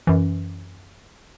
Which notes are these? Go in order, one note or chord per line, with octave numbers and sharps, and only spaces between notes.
F#2 E3